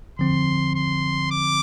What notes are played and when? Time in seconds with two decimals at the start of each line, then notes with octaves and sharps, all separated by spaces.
0.19 D3 F3 C4 C6
0.75 C6
1.32 D6